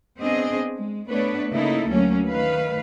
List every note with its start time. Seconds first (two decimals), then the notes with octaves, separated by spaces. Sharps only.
0.19 B3 C4 D4 G#4 D#5
0.75 G#3
1.10 A3 B3 D4 B4 C#5
1.51 C#3 A#3 D#4 E4 A4
1.89 D2 F#3 A#3 C#4
2.26 D#3 A3 B4 F5